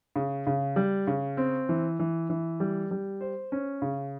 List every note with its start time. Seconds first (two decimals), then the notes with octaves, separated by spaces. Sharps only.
0.16 C#3
0.47 C#3
0.76 G3
1.07 C#3
1.37 C4
1.69 E3
1.99 E3
2.30 E3
2.60 G3
2.91 G3
3.21 C5
3.52 C#4
3.82 C#3